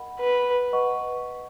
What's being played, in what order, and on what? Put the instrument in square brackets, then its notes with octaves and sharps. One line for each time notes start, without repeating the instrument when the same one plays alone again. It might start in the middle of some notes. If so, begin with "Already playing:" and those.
Already playing: [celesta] A#4 D#5 F#5 B5
[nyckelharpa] B4
[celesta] B4 D#5 F#5 C#6